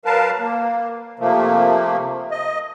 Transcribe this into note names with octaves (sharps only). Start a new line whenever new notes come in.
F#3 A#4 B4 F5 A5
A#3
C3 F3 A3 A#3
D#5